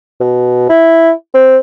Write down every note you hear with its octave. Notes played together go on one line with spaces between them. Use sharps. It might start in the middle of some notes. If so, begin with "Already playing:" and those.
B2
E4
C4